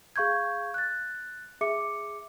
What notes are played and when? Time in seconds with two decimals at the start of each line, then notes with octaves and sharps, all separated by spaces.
0.16 G#4 F5 C#6 G6 G#6
0.74 F#6 A6
1.61 G#4 E5 D6 C#7